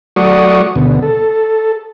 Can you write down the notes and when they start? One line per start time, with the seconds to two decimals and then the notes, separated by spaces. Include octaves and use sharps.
0.16 F#3 A3 F#4 D5 C#6 D#6
0.76 D2 B2
1.02 A4